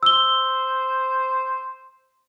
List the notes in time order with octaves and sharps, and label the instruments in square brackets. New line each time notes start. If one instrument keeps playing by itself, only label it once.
[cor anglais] C5 [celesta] E6 G7